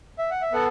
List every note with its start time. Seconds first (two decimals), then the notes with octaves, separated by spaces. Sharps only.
0.19 E5
0.31 F#5
0.42 E5
0.52 B3 A4 F#5